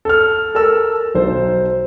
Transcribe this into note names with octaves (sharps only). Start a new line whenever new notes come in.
A4 F6
A4 A#4 A5 E6
B1 C5